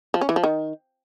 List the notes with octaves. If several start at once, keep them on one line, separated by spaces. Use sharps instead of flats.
F3
C#4
E3
F3
D#3